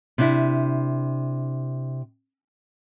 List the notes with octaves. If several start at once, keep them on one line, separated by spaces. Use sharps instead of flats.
C3 D4 E4